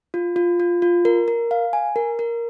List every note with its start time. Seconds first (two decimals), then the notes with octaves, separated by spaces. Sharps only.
0.14 F4
0.36 F4
0.60 F4
0.82 F4
1.05 A#4
1.28 A#4
1.51 F5
1.73 G#5
1.96 A#4
2.19 A#4